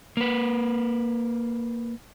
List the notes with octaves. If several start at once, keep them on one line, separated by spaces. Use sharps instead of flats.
A#3 B4